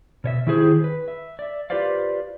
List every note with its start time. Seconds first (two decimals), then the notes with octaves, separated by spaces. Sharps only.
0.24 B2 C#5 E5
0.47 D#3 E4 G4 G#4 C5
0.84 B4
1.08 E5
1.39 D5 E5
1.70 F4 G4 B4 C5 D5 F5